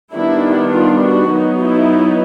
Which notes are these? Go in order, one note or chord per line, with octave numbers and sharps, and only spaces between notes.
D#3 G3 B3 D4 E4
F4
F#4
F#3 B3 D#4
E4